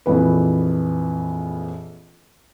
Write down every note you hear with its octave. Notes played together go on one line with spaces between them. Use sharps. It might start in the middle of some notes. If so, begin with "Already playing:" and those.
A#1 F2 E3 B4